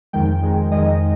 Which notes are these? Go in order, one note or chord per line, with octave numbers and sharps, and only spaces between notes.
F2 D#3 G#3 G5
F2 D#3 G#3
F2 D#3 G#3 D#5